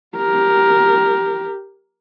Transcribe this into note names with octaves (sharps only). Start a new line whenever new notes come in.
G4 A#4